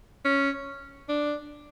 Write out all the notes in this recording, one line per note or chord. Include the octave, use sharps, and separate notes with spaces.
C#4
D4